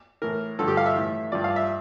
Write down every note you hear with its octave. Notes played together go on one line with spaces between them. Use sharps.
A2 E3 A#4
G2 D3 F3 A4
G4
F5
E5
A2 E3
G2 F3 D5
F5
E5